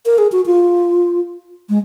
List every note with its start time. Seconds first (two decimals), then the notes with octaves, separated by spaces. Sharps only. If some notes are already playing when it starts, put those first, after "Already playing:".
0.06 A#4
0.18 G#4
0.32 F#4
0.46 F4
1.69 G#3